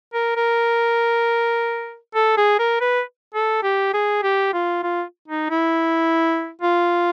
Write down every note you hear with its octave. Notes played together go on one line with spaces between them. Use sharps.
A#4
A#4
A4
G#4
A#4
B4
A4
G4
G#4
G4
F4
F4
D#4
E4
F4